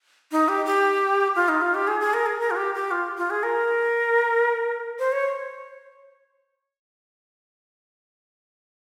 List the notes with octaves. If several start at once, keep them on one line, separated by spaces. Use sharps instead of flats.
D#4
G4
G4
F4
D#4
F4
G4
G#4
G#4
A#4
G#4
A#4
F4
G4
G4
F4
F4
G#4
A#4
C5
C#5